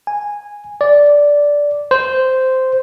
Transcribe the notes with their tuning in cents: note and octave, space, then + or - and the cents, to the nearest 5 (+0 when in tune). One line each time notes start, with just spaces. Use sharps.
G#5 -10
D5 -10
C5 -10